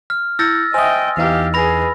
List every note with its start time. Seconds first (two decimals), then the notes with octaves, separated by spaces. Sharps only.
0.10 F6
0.39 E4 E6 G6 A6 A#6 C#7
0.74 C5 D#5 E5 G5 G#5 D#6
1.17 E2 E3 D#4 G4 F5
1.54 G#4 B4 B5 A#6 F7